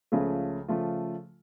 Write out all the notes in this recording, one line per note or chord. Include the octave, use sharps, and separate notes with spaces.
C#2 C#3 F3 A3 F4
C#3 F3 A3 F4